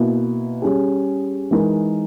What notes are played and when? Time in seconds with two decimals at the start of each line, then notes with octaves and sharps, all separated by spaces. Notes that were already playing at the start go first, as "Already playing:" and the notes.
Already playing: B2 A#3 E4
0.62 G3 C#4 G#4
1.51 E3 G#3 D#4 A#4